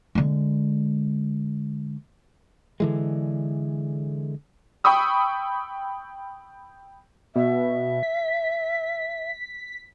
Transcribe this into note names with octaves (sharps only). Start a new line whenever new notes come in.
D3 G#3
D3 E3 G#3
G5 B5 C#6 D#6 E6
B2 E5
B6